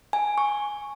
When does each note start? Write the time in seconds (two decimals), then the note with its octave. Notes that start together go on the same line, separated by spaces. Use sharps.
0.13 G#5
0.38 C#6